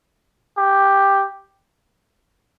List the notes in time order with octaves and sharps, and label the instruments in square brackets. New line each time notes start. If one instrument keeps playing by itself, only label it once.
[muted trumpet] G4